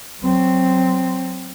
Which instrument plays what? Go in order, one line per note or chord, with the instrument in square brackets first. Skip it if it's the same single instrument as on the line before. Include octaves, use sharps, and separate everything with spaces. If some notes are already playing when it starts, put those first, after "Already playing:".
[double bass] F#3 C4